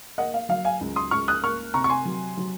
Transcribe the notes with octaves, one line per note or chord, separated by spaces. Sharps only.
A#3 D#5 F#5
F5
F#3 F5
F5 G#5
C#2
C6 D#6
C#2 C#6 F6
D#6 F#6
A#3 C#6 F6
C3 A#5 C#6
C#6
G#5 C6
F#3
F#3